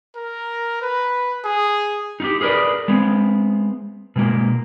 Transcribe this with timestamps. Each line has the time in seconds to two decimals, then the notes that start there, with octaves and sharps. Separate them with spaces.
0.16 A#4
0.82 B4
1.44 G#4
2.20 D#4 F4 G4
2.41 G#4 A#4 B4 D5
2.88 G#3 B3 C4
4.16 B2 G#3 A#3